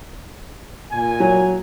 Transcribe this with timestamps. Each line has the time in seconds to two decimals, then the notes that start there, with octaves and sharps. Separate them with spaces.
0.91 A#2 G#5
1.20 F#3